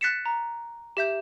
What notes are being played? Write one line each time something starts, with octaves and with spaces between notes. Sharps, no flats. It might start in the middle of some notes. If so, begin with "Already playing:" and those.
F#6 A6 B6 C#7 E7
A#5
G4 E5 G6